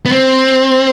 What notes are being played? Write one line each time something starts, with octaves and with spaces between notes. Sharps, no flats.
B3
C4